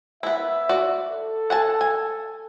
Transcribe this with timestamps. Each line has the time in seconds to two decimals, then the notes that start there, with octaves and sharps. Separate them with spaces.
0.23 B3 E4 E5
0.69 F#4 D5
1.11 A4
1.50 F#5 G#5 A5
1.81 G#5